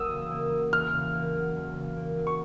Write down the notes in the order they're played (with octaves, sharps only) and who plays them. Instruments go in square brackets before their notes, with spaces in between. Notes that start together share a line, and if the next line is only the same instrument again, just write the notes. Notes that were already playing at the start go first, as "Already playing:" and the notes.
Already playing: [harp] E2 F#3 A#3 [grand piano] D#6 E6
[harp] C#3
A#3
F#3
[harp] E2 [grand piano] F6
[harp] C#3
A#3
F#3
E2
C#3
A#3
F#3
[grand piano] C#6